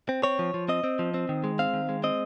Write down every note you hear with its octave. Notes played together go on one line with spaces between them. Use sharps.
C4
C4 C#5
F3
F3
C4 D#5
C4
F3
C4
D#3
G#3
C4 F5
D#3
G#3
C4 D#5